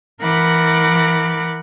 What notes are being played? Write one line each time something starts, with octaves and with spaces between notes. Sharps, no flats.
E3 A#4 F#5 B5 D6